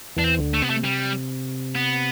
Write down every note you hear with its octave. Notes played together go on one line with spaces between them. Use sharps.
E2 E3 D4
C4
D2 D3
A3
C3 B3
A3
G3
B3